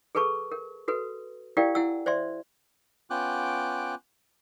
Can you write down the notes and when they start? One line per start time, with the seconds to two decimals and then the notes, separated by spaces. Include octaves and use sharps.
0.15 G#4 A4 B4 A5 C#6
0.52 A#4
0.88 F#4 A4 B4
1.57 E4 G4 A#4 D5 F5 G5
1.75 E4 F#5 G#5 E6
2.06 C5 D5 E5 C6
3.10 B3 C#4 F4 G5 D6 F#6